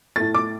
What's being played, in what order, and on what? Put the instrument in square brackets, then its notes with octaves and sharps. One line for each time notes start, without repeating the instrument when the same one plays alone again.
[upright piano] A2 A3 A6
D6